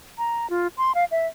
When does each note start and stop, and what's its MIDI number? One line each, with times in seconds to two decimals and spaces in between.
0.18 0.49 82
0.50 0.68 65
0.77 0.92 84
0.95 1.05 77
1.11 1.27 76